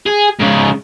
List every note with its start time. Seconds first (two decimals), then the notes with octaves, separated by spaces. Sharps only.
0.06 G#4
0.40 G#2 C#3